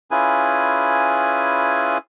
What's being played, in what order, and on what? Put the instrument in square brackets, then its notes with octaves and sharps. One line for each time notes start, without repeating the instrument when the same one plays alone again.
[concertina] C#4 E4 F4 G#4 B4 G#5